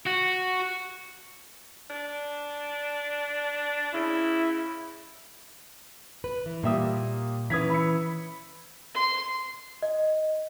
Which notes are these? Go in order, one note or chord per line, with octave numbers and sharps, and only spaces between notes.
F#4
D4
C#3 E4
B4
E3
A#2 G3 A#3 G4 E5 D#6
E3 C#4 B4 D#6 G#6 B6
B5 E6 C#7
C6
D#5